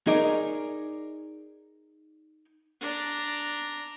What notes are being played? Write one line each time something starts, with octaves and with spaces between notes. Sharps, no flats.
D#4 G#4 A#4 C#5 D5
D4 A#5